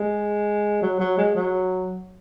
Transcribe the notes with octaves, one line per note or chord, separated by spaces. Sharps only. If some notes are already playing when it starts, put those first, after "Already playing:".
Already playing: G#3
F#3
F#3
G#3
F#3